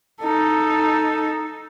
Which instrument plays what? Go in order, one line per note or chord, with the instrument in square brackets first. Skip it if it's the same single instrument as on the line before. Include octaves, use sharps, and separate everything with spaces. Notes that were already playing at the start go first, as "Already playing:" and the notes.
[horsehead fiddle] D#4 A4